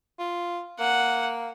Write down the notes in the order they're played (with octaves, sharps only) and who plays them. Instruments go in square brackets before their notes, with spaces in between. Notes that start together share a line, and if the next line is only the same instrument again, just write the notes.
[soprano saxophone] F4
[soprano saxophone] A#3 [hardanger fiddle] F#5